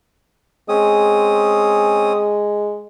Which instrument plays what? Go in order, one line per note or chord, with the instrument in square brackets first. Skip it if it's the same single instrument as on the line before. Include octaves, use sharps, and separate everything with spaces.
[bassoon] G#3 [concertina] C4 C#4 D#6